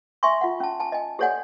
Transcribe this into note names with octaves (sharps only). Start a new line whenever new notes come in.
E5 G#5 C6 C#6
F4 F#5
C#4 A5
G#5 A5
D#5 G#5
G4 A4 C#5 D5 F#5 G#5